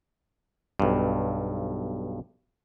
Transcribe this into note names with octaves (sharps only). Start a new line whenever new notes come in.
B1 G2